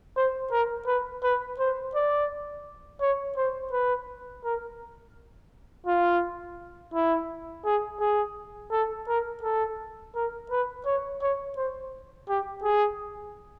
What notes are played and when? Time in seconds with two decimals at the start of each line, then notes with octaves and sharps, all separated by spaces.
0.17 C5
0.51 A#4
0.87 B4
1.23 B4
1.59 C5
1.95 D5
3.01 C#5
3.37 C5
3.72 B4
4.45 A#4
5.86 F4
6.94 E4
7.65 G#4
8.01 G#4
8.72 A4
9.08 A#4
9.43 A4
10.15 A#4
10.51 B4
10.86 C#5
11.22 C#5
11.57 C5
12.29 G4
12.64 G#4